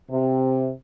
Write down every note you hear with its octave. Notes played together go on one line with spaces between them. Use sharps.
C3